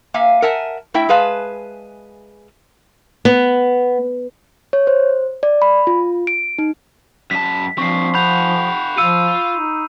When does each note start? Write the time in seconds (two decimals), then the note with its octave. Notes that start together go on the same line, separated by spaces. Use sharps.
0.14 A#3 E5 F5 G#5
0.42 A#4 E5 F#5 G#5 A5
0.94 A3 E4 E5 G5
1.09 G#3 G#4 B4 F5 A5
3.25 B3
4.73 C#5
4.87 C5
5.43 D5
5.62 B5
5.87 F4
6.27 D7
6.58 D#4
7.31 F#2 A5 B6
7.78 F3 C4 D4 C#6 C7
8.15 G4 F#5 B5 G6 F7
8.98 F3 F4 E6 C#7 D#7
9.54 D#4